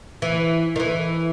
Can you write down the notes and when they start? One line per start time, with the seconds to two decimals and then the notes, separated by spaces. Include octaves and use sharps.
0.22 E3
0.76 D#3
0.80 E3